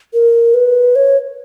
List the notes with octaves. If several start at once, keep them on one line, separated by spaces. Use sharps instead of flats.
A#4
B4
C#5